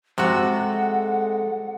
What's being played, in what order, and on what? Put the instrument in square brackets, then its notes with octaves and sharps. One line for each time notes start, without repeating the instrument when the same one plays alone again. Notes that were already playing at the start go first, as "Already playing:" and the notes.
[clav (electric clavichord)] C3 F#4 [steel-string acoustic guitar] G#3 A4 [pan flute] F#5